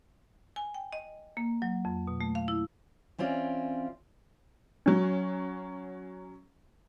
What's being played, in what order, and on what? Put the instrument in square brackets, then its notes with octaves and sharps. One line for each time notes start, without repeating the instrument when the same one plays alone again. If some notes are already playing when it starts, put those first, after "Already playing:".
[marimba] G#5
G5
D#5
A#3
F#3
F2
B2
A3
F5
E4
[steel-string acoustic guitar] E3 C4 C#4 F4 D5
[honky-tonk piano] F#3 C#4